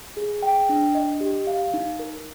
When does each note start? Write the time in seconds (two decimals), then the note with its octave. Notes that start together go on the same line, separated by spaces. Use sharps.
0.17 G#4
0.42 G5
0.69 D4
0.95 D#5
1.21 G4
1.47 F5
1.74 D#4
2.00 A#4